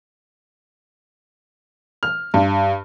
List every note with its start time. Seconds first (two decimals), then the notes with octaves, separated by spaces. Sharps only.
2.03 F6
2.34 G2